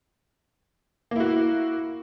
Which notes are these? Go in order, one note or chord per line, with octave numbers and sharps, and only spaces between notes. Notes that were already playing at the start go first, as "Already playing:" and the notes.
A#3 E4 F#4